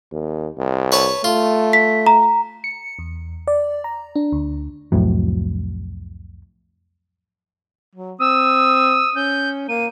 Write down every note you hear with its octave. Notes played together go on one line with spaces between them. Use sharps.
D#2
C2
B4 C#5 A5
A3 F4
B6
A#5
C#7
E2
D5
A#5
D4
D2
C2 F2 A2 F#3
F#3
C4 D#6 E6
C#4 G6
A#3 D#7